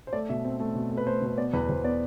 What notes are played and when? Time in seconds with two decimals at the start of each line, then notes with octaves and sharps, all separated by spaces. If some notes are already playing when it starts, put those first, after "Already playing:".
0.07 C5
0.13 A3 D5
0.29 B2 E5
0.45 C4
0.60 A3
0.75 B2
0.91 A3
0.97 B4
1.07 A3 C5
1.22 B2 C5
1.37 B3 D5
1.53 E2 B4
1.69 E2 C5
1.84 B3 D5